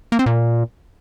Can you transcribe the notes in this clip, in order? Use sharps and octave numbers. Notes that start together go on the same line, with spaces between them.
A#3
C4
A#2